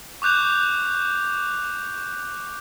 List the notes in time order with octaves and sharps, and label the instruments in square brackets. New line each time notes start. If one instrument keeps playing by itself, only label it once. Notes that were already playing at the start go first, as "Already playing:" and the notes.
[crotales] C#6 D6 F#6 G6 F7